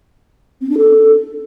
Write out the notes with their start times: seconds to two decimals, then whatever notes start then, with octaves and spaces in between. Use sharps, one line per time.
0.61 C4
0.69 D4
0.78 A4